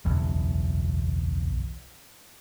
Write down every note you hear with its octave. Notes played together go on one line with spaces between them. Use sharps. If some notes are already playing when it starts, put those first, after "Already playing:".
F#1 B1 E2